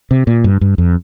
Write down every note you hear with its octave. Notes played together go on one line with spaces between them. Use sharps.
C3
A#2
G2
G2
F2